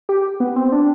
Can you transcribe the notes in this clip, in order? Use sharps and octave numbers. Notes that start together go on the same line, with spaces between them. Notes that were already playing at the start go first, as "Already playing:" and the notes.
G4
B3
C4
D4